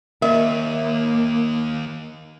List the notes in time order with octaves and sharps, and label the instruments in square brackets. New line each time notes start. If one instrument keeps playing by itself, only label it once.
[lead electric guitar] D#2 [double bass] A#3 [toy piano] A#4 D#5 [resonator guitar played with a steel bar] E5